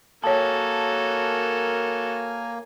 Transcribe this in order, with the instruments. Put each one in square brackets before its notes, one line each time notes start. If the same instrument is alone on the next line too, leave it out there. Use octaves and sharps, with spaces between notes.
[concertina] A#3 [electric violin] F#4 A4 [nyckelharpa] A#4 G#5 [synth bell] C#5 A5